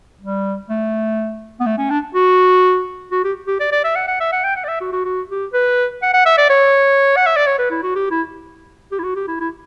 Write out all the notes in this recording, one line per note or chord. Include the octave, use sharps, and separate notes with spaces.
G3
A3
B3
A3
C#4
D4
F#4
F#4
G4
G4
D5
D5
E5
F#5
F#5
E5
F#5
G5
F#5
D5
E5
F#4
F#4
F#4
G4
B4
F#5
F#5
E5
D5
C#5
F#5
E5
D5
C#5
B4
E4
F#4
G4
E4
G4
E4
F#4
G4
E4
E4